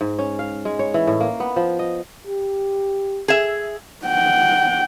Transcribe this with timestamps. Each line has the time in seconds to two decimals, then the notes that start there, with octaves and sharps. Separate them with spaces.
0.01 G#2
0.19 C#4
0.39 F5
0.65 G#3
0.79 C#5
0.94 E3
1.07 A2
1.20 A#3
1.40 B3
1.56 F3
1.79 D#5
2.27 G4
3.28 G#4 E5
4.06 F#5 G5